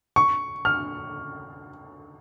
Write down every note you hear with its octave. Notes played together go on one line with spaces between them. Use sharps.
C#6
F6